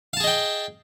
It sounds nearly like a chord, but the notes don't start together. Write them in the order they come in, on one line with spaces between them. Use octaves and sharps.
F5 A5 G#4 D#5 G5